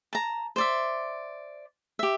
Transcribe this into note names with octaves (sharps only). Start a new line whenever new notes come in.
A5 A#5
C5 D5 E5
G4 E5